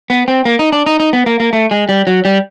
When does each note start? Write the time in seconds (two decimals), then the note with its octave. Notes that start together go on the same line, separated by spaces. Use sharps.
0.10 B3
0.28 C4
0.45 A#3
0.59 D#4
0.72 D4
0.86 D#4
1.00 D#4
1.13 B3
1.26 A#3
1.40 A#3
1.53 A3
1.71 G#3
1.89 G3
2.07 F#3
2.25 G3